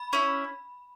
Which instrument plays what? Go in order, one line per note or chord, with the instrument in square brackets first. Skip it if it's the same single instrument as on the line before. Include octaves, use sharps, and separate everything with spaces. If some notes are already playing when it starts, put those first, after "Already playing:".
Already playing: [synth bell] B5
[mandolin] C#4 E4